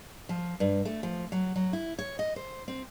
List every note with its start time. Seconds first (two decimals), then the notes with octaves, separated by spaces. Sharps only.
0.29 F3
0.60 G2
0.85 A3
1.03 F3
1.32 F#3
1.56 F#3
1.73 E4
1.99 C#5
2.19 D#5
2.36 C5
2.68 C4